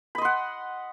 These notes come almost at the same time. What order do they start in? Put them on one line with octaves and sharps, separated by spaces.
B5 D#5 C6 F#5